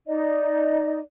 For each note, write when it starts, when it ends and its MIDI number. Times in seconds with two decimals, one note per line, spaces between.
0.07 0.99 63
0.07 0.99 74
0.07 0.99 75